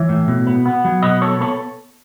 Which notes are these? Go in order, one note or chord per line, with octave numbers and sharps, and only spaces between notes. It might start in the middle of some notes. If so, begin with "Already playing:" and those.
Already playing: E3 C#5 E5
A2
B2
B3
B3
F#3
B2 B4 D#5
B3 A4 C#5
B3 A4 C#5